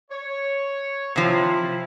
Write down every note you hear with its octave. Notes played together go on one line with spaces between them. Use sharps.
C#5
C3 F3 E4